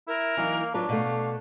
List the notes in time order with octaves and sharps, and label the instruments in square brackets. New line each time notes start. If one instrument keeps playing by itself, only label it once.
[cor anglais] E4 [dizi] A#4
[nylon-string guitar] E3 F#3 D#4 [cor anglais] A#3
[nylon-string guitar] F#3 F4 B4 [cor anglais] D4
[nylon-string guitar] B2 A3 [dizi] F5